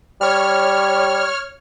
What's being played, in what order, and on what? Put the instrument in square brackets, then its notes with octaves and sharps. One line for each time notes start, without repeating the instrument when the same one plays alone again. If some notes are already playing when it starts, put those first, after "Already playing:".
[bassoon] G3 [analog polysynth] C#5 F6